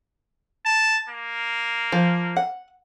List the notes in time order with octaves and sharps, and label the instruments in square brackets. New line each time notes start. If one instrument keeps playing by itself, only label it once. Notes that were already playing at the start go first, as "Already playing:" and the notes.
[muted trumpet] A5
A#3
[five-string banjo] F3
F#5